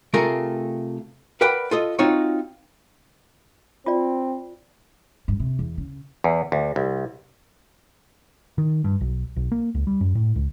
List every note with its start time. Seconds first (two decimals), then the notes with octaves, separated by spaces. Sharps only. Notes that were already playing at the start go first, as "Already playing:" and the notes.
0.14 C3 A3 F4 G#4 A#4
1.41 A#4 B4 D5 F#5 G5 B5
1.71 F4 A4 D#5
1.99 C4 D#4 F4 F#4 C#5
3.86 C4 F4 D5
5.28 G2
5.40 C3
5.59 E2
5.78 C#3
6.24 E2
6.52 D2
6.76 C2
8.58 D#3
8.84 G2
9.01 B1
9.36 B1
9.52 A#3
9.75 C#2
9.87 G3
10.01 F#2
10.15 A2
10.36 C#2